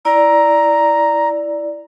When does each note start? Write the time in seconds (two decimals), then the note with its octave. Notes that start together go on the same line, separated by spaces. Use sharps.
0.05 E4 D5 A#5